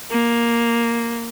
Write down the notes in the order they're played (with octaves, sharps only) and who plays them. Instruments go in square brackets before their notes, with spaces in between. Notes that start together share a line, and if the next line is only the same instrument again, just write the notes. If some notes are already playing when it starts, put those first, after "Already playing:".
[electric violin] A#3